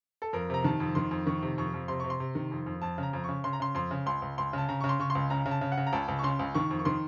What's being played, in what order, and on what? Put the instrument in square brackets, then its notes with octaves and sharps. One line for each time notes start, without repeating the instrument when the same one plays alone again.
[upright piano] A4
F2 A#4
C3 A#5
D#3 A5
F2
D#3 C6
F2
D#3 C#6
C3
F2 C#6
F2
C3 C6
C3 C#6
C6
C3
D#3
F2
F2
F2 A5
C#3 A#5
F2
C#3 C#6
C#3 C6
A#5
C#3 C6
F2 C6
C#3
C#2 C6
C#2
C#2 C6
C#3 A5
C#3 A#5
C#3 C#6
C6
C#3 C#6
C6
C#2
C#3 A#5
C#3
A5
C#3
F#5
C#3
A#5
C#2 A5
C#2
C#6
C#3 C6
C#2
D#3 C#6
F2
C#6
D#3 C6